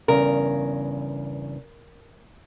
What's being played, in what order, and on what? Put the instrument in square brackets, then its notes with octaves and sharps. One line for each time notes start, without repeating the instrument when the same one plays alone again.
[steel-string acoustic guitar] E2 G2 C#3 [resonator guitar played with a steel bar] A#4